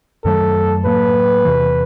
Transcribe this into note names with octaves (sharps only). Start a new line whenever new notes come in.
F#2 D#3 F#3 A3 A4
A2 F#3 A#3 B4
E2 C3 E3